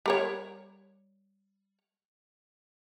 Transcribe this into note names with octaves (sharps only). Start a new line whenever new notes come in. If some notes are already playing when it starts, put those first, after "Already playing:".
G3 A#4 C#5